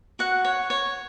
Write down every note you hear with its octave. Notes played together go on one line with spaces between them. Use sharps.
F#4 F#5
C#5
C#5